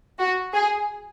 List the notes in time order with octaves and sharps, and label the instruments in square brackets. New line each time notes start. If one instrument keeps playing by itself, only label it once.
[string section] F#4
G#4